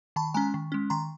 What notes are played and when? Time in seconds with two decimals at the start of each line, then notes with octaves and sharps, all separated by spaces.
0.16 D#3 A5 B5
0.34 G#3 C#4 G#5 A#5
0.54 D#3
0.72 G#3 C#4
0.90 D#3 A#5 C6